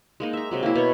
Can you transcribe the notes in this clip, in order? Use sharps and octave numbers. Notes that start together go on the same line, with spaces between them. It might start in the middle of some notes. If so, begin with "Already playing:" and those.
G#3 A#3 D#4
E5 A#5
C3 F#3 G#3
A#3 E4
B2 C#5